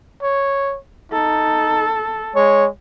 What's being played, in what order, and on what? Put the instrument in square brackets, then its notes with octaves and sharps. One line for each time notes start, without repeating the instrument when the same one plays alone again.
[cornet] C#5
[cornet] D#4 [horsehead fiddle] A4
[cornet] G#3 [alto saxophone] C#5